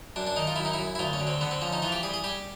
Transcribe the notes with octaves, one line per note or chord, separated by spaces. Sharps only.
F#2 D4
D4
D#3 D#4
F4
F#2 E4
D#4
E4
F#2
E4
D2 F4
C#4
D3
C4
D3 B3
C4
F3 C#4
D#4
E3 F4
G4
G3 G#4
G#4
G3 G4